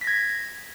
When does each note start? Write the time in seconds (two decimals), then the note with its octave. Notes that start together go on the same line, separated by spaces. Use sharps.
0.01 B6
0.04 A#6
0.07 G#6